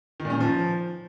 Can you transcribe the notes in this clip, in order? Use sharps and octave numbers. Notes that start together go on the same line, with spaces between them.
D#3
A#2
C#4
D#3
F3